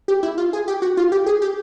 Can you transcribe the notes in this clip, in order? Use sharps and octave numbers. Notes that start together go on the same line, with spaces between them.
G4
E4
F4
G#4
G4
F#4
F4
G4
G#4
G4